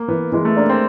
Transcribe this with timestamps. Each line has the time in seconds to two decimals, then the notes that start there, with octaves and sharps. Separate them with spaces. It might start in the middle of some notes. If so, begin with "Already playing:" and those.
Already playing: A#3
0.08 E3 B3
0.32 E3 G#3
0.45 A3
0.57 A#3 D4
0.69 C4